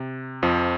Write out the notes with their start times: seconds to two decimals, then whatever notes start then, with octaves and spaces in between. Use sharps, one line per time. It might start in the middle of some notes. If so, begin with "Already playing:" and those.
Already playing: C3
0.43 F2 F3